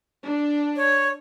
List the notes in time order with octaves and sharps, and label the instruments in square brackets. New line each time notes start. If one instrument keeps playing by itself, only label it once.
[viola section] D4
[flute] C#5